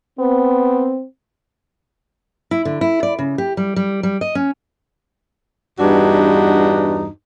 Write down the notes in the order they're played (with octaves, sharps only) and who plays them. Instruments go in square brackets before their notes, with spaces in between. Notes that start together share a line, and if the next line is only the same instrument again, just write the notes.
[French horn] B3 [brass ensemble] C4
[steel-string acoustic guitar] E4
D3
E4
D5
C#3
G4
G3
G3
G3
D#5
C#4
[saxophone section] E2 G2 D4 D#4 F#4